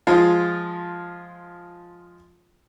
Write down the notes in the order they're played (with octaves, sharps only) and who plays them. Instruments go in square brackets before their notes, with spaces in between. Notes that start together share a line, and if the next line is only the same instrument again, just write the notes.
[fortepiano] F3 G#3 F4